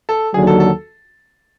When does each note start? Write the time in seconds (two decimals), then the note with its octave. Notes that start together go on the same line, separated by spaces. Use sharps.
0.09 A4
0.34 D#2 D3 F#3 G#4
0.47 A4
0.60 A4